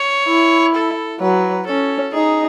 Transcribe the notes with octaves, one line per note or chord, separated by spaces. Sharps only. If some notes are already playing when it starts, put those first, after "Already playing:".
Already playing: C#5
E4
A4
F#3 B4
C#4 A4
D#4 G#4